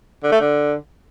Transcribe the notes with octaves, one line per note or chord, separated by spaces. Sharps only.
D3
A3
D3